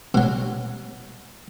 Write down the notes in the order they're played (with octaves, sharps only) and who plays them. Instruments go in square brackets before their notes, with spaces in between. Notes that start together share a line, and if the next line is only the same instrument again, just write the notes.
[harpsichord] B2 F#3